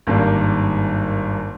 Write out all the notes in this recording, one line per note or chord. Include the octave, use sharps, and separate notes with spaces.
G#1 G2 A#3